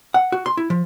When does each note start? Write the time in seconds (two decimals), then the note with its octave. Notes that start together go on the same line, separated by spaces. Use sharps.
0.14 F#5
0.32 F#4
0.46 C6
0.57 E4
0.70 F3